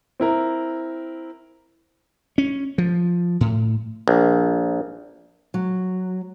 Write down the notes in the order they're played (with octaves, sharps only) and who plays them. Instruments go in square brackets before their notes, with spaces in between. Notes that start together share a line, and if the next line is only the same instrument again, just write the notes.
[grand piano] C4 E4 A#4
[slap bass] C#4
F3
A2
[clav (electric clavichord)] A#1
[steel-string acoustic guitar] F#3